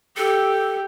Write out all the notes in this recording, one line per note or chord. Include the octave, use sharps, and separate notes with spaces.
G4 A4